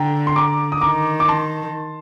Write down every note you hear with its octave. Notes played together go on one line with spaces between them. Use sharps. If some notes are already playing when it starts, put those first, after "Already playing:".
Already playing: D3 G5 A#5
C6
A#5 D6
D#6
D#3 A#5 D6
D6
A5 C6